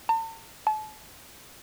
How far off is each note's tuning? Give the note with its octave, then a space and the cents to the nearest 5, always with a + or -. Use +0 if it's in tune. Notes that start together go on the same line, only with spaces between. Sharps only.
A5 +45
A5 -35